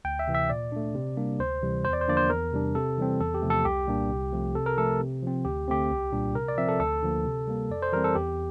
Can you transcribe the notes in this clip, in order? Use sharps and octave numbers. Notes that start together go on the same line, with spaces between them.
D2 G5
E5
C3 E3
E5
A#2 D5
A3 D4
C3
G3 A#3 D4
D2 C5
C3 E3 G3
E2 C5
D5
C5
D3 F3 A#3 D4 D5
C5
E2 A#4
C3 G3 D4
C3 A4
E3 G3 C4
E2 A4
G4
C3 F3 A3
A4
C2 G4
A#2 G3 A#3 D4
C2
C3 F3 A3
C3 A4
A#4
F3 A3 A4
C3
F3 C4
D2 G4
D3 A3 C4 G4
C2
A#2 G3 D4
C3 A#4
D5
F3 C4 E5
A4
D2 A4
D3 F3 A#3
C3
G3 A#3
F2 D5
C5
E3 G3 C4 A#4
A4
E2 G4